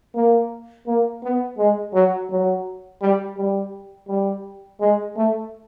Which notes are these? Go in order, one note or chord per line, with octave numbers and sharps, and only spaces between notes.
A#3
A#3
B3
G#3
F#3
F#3
G3
G3
G3
G#3
A3